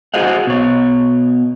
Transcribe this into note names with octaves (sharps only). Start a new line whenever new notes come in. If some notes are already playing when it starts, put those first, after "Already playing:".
F#4 G#4 C5 D#5 F5 F#5
B2 C#5